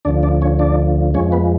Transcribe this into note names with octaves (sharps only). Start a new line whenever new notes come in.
D2 D3 F3 D4 D5
D4 D5
C#4 C#5
D4 D5
F2 F3 G#3 C#4 C#5
B3 B4